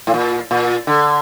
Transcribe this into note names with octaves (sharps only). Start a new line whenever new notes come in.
A2
A#2
A#2
D3